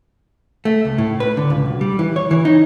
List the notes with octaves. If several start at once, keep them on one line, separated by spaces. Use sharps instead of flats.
A3
C#2
A2
B4
D3
C#2
B1
G3
E3
C#5
E3
D#4